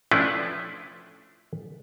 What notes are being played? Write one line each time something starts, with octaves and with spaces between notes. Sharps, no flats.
F3 A3 C#4 D4 E4 B4